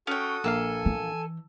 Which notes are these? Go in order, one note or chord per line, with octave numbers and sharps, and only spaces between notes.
C#4 F#4 A4 G5 D#6
A#1 A#3 A4 F5 G#5
E3